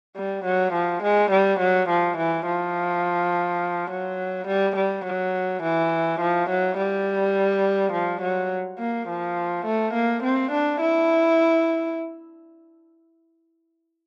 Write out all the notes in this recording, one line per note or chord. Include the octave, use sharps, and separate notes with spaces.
G3
F#3
F3
G#3
G3
F#3
F3
E3
F3
F#3
G3
G3
F#3
E3
F3
F#3
G3
F3
F#3
A#3
F3
A3
A#3
C4
D4
E4